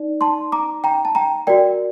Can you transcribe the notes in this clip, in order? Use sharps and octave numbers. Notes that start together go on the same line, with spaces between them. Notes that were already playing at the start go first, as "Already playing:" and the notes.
Already playing: D#4 D5
A5 C6
A#5 D6
G5 A#5
A5
G5 A#5
F#4 A#4 D5 G5